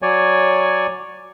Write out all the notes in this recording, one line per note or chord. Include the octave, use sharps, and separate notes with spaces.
F#3 C#5 D5 G#5